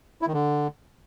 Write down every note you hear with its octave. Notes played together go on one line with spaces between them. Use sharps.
E4
D#3
D3